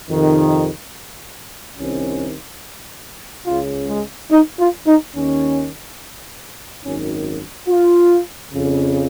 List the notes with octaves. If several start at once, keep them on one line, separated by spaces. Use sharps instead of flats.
F2 C3 D#3
C2 C3 D#3 C#4
C#2 C#3 F4
G#3
D#4
F4
D#4
D#2 D#3 C#4
G#1 F#2 D#3 C#4
F4
F2 C#3